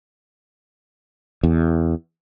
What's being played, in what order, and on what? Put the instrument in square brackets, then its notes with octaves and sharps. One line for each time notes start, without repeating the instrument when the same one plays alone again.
[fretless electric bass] E2